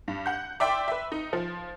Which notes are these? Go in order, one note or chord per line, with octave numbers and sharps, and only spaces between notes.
G2
F#5 G6
D5 E5 G5 C6 D6
B4 E5
D#4
F3